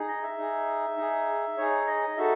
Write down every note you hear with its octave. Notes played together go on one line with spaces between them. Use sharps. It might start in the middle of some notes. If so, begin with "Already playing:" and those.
Already playing: D#4 G#4
D#5
E5
D#4 G#4
D#4 G#4
D#4 G#4 C#5
D#5
D#4 F#4 A4 E5